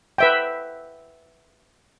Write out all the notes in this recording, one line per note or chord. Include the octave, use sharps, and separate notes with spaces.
B4 E5 G5